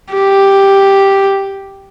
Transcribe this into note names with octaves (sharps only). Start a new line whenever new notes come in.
G4